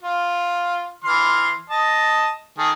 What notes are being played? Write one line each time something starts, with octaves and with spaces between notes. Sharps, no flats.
F4
E3 C6 F6
D#5 A5
D#3 G#4 A4